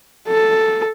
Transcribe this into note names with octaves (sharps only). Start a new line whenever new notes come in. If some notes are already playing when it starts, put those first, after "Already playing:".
A4